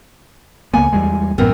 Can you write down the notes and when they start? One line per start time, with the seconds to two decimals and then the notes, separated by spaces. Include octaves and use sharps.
0.74 C#2 A#3 B3 G#5
0.93 E2 G3 G#3
1.38 A1 F#2 A2 B3 C4 A#4